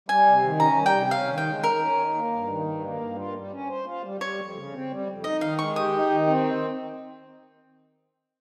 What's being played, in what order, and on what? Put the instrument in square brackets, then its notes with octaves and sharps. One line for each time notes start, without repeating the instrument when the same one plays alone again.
[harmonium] G3 [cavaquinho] G#5
[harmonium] C3
D#3
[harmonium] C#4 [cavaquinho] A#5
[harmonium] G3
[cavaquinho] G5
[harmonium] C3
[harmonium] C#4 [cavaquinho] F5
[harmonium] D#3
[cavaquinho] G5
[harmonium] G#3
[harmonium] D#3 [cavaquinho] A#4
[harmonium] C#4
D#3
A#3
G2
D#3
G2
A#3
G2
F4
G3
C#4
C5
F4
G3
[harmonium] G3 [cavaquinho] C#5
[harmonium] F2
C#3
C4
G3
F2
[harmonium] D#4 [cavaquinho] D#5
[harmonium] D#3 [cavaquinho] F5
[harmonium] G#3 [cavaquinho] C#6
[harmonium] G4 [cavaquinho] D#6
[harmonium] D#4
D#3
C4